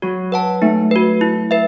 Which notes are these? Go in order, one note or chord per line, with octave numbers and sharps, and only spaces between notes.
F#3 F#4
B4 F#5 A5
A3 D#4
F#4 B4
E4
B4 E5